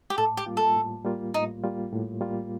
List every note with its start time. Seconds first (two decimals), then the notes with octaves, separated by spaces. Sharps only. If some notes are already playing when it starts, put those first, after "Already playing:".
0.10 G4
0.18 A2 A4
0.37 G4
0.46 G3 A#3 F4
0.57 A4
0.76 A2
1.04 G3 A#3 F4
1.34 A2 D#4
1.64 G3 A#3 F4
1.93 A2
2.21 G3 A#3 F4